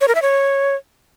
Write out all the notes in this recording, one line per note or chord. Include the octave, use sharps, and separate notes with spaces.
C#5
A#4
E5
C#5